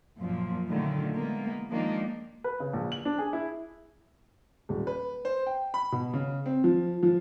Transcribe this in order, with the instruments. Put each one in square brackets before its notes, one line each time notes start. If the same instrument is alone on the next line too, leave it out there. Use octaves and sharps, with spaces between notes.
[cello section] F#2 A#2 F3
A#2 D3 D#3 F#3 A3
E3 G#3 A#3 B3
D#3 F3 G#3 A#3 D4 D#4
[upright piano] B4
C#3
A#1
F#7
D4
G#4
E4
[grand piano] D#1
B4
C5
G5
B5
B2
C#3
C4
F3
F3